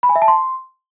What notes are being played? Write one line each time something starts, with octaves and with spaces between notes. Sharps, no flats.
B5
G#5
E5
A5
C6